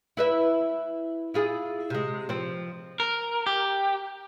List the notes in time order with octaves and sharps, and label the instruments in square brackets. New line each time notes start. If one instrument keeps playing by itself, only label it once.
[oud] E4 B4 E5
E4 F4 G#4
C3 G#3
F3 C4
[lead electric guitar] A#4
G4